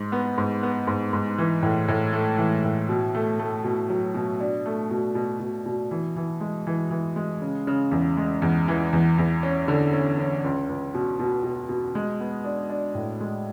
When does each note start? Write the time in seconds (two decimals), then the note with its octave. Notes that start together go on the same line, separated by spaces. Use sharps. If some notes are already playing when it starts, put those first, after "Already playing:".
Already playing: G#2
0.12 B3
0.38 G#2
0.63 B3
0.87 G#2
1.13 G#2
1.38 E3
1.63 A2
1.88 A2
2.13 A3
2.38 E3
2.64 A2
2.89 B2
3.15 A3
3.39 A3
3.64 B2
3.90 F#3
4.15 B2
4.40 D4
4.66 A3
4.91 B2
5.15 B2
5.40 B2
5.66 B2
5.91 E3
6.16 E3
6.40 G#3
6.67 E3
6.91 E3
7.16 G#3
7.42 C#3
7.67 C#3
7.91 E2
8.17 G#3
8.42 E2
8.68 E3
8.93 E2
9.18 E2
9.43 C#4
9.68 D3
9.93 C#4
10.19 C#4
10.44 C#2
10.69 C#2
10.94 B2
11.19 B2
11.44 B2
11.69 B2
11.95 G#3
12.20 B3
12.44 D4
12.70 D4
12.95 A2
13.21 G#3